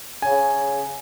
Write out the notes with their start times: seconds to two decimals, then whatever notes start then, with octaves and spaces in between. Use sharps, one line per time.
0.22 C#3 G#5